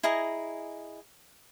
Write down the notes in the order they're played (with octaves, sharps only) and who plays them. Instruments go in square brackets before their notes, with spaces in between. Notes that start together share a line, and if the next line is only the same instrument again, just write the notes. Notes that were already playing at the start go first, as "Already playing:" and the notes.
[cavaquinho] E4 G#4 D#5 A#5